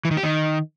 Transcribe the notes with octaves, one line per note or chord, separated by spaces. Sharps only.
E3
D#3
G4
D#3